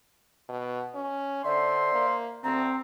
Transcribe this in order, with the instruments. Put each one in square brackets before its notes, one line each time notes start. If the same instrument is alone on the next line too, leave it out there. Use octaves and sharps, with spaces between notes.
[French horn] B2
C#4
[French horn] D3 [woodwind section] C5 E5 C6 [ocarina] D5
[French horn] A#3
[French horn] D2 [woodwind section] C4 [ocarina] A#5